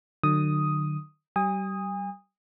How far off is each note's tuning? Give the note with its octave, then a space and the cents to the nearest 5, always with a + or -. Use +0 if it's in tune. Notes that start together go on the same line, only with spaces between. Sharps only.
D3 +45 F#3 +0 D#6 +0
G3 -30 G#5 -40 D#6 +0